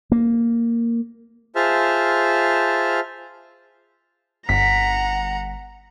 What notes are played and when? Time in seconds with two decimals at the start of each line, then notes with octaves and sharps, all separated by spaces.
0.12 A#3
1.55 F4 G#4 C5 E5 A5 F6
4.49 G1 F#5 A#5 B6